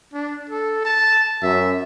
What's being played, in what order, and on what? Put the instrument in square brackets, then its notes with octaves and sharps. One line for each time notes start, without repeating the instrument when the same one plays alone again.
[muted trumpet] D4
A4
A5
[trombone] F#2 [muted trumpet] E5